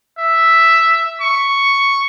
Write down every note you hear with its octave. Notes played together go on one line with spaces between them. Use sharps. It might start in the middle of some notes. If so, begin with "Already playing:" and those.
E5
C#6